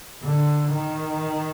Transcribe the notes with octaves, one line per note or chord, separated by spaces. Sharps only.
D3
D#3